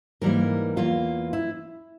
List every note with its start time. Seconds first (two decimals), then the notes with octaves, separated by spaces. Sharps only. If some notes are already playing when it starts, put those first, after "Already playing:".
0.21 G#2 E3 G3 A#3 A#4
0.76 E2 E3 A#3 F4
1.33 E4